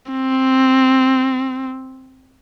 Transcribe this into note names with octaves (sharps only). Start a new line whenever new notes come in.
C4